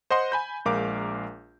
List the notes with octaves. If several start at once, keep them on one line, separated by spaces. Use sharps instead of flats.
C5 D#5 F#5 C6
G#5 B5 G6
A#1 G#3 A#4 F5 D6